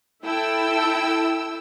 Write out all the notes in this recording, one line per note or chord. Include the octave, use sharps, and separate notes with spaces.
E4 A4 G5 E6